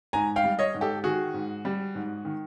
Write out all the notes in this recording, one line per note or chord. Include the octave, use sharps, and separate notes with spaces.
G#2 G#5 A#5
F5 G5
G3
C#5 D#5
G#2
G4 A4
D#3 F#4 G#4
G#2
G3
G#2
D#3